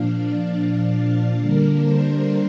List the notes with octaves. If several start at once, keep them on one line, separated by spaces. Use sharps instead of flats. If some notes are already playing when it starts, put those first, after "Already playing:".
Already playing: A#2 F3 D4 F5
D5
F5
F5
D3 G3 A#3 D4 A#4
C5